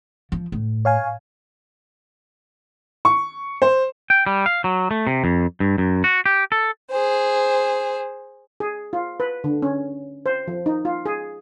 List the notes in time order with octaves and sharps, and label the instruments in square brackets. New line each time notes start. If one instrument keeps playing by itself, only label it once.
[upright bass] F3
A2
[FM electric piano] C#5 F5 G#5
[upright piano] C#6
C5
[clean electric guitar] G5
G3
F5
F#3
A3
C3
F2
G2
F#2
F#4
G4
A4
[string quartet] G#4 C5
[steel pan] G#4
F4
B4
D3
C#4
C5
F3
D#4
F4
G#4